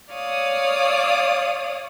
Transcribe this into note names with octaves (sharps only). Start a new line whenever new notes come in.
C#5 D5 F5 D#6